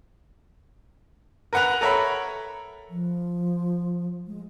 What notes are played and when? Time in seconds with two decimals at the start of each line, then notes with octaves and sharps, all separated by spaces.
1.53 A#4 B4 F#5 F#6 F7
1.81 A4 A#4 C#5 E5 A#5 B5
2.90 F3
4.27 G#3